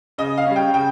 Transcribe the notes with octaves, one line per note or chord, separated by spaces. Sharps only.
C#3 D#5
F5
G3 C#4
G5
C#3 G5